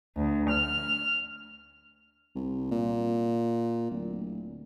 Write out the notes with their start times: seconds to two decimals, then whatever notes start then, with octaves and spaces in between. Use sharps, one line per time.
0.17 D2
0.50 F6
2.35 C2
2.71 A#2
3.91 D1